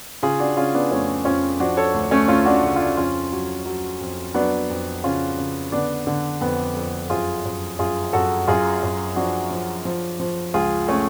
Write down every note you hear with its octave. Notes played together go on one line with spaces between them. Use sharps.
C#3 F4 G#4
D4 F#4
C#3 C#4 F4
B3 D4
F2 A3 C#4
F2 C#4 F4
F3 D4 F#4
A4 C#5
D2
A3 C#4
D2 C#4 F4
D4 F#4
C#3
F4
D4 F#4
F2 C#4 F4
F#3
F#3
F2
F#3 B3 D4
F2
C#3 C#4 F4
C#3
D3 B3 D4
D3
F2 B3
F2
F#2 F4 G#4
F#2
F#2 F4 G#4
F#2 F#4 A4
F#2 F4 G#4
F#2
F3 D4 F#4
F3
F3
F3
C#2 F4 G#4
A3 C#4